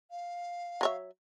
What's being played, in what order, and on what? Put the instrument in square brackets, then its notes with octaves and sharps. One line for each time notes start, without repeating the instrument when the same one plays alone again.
[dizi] F5
[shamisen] F#3 C#5 E5